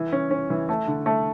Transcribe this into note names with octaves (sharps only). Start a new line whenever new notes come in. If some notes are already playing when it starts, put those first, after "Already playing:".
Already playing: E3
C#4
C#4
E3
A3
D3
A3